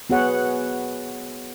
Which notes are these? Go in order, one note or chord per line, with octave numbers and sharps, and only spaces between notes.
B3 F#4 G#4 C#5 F#5